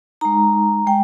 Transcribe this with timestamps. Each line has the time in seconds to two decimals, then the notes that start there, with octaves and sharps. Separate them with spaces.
0.21 G#3 D#4 A#5
0.87 G#3 G5